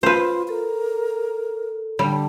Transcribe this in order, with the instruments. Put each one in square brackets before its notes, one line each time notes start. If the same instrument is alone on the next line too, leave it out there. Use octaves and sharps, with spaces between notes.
[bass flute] F4 [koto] B4 C5
[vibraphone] A4 [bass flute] A#4
[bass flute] D3 [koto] G3